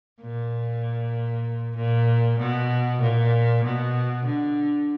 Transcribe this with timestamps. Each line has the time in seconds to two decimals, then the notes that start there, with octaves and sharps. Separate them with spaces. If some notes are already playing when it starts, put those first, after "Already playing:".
0.21 A#2
1.77 A#2
2.39 B2
3.02 A#2
3.65 B2
4.26 D3